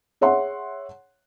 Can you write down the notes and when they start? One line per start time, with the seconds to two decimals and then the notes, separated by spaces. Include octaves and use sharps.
0.21 G#4 C#5 E5 F#5 C6